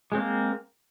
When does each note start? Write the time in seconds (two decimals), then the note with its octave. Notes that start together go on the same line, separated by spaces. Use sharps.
0.12 G#3
0.15 C4
0.18 A#3